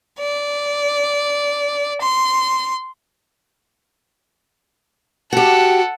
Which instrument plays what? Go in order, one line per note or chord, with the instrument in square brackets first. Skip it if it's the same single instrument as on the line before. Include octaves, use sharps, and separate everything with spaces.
[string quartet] D5
C6
[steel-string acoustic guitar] F#4 G4 [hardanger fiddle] A4 F#5